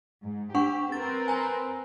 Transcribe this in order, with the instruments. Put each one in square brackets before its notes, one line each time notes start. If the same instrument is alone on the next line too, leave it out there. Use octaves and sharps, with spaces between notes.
[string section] G#2
[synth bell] D4 F#5 C#6 [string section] G4
[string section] C4 A#4 B4 [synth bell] A6
[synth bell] G#5 A#5